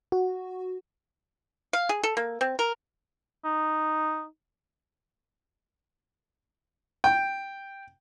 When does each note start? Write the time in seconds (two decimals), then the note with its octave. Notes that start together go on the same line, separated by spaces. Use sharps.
0.12 F#4
1.73 F5
1.89 G#4
2.03 A4
2.17 A#3
2.41 C4
2.59 A#4
3.45 D#4
7.04 G5